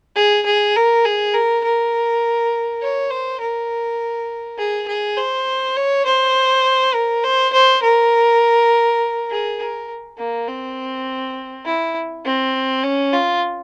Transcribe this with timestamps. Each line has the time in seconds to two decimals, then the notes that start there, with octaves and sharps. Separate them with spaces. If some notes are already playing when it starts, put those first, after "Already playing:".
0.16 G#4
0.46 G#4
0.76 A#4
1.05 G#4
1.34 A#4
1.64 A#4
2.82 C#5
3.11 C5
3.40 A#4
4.59 G#4
4.88 G#4
5.17 C5
5.77 C#5
6.06 C5
6.94 A#4
7.24 C5
7.53 C5
7.83 A#4
9.30 G#4
9.60 A#4
10.18 A#3
10.48 C4
11.66 E4
12.25 C4
12.84 C#4
13.13 F4